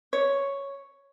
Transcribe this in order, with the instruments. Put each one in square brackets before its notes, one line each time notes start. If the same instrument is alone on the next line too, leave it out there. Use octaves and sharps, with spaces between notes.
[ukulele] C#5